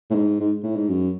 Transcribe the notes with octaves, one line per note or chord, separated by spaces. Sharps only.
A2
G#2
G#2
A2
G#2
F#2